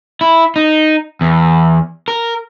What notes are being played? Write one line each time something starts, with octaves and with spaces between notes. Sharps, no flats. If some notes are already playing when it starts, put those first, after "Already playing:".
E4
D#4
E2
A#4